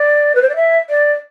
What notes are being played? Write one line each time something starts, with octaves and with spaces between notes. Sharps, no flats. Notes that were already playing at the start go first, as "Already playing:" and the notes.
Already playing: D5
B4
C5
D5
E5
D5